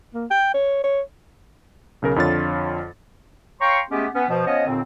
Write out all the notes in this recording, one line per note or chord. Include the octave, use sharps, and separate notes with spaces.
A#3
G5
C#5
C#5
B1 C#3 A#4
F2 D3 F4 C#5 A6
C#5 F5 G5 A#5 C6 C#6
G#3 A3 B3 C#4 G4
B3 C#4
B2 F3
F3 B3 C#4 C#5 D#5
D#2 A#2 D3 C4